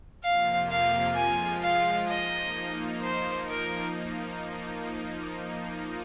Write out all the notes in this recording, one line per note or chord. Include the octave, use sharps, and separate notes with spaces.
F2 C3 F3 A#3 F4 F5
F5
F3 G#3 F4 G#5
F5
F3 A#3 D#4 D#5
F3 A#3 D#4 C5
A#4